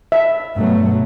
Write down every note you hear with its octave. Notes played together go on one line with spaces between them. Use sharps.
E5
G2 B2 F#3 A3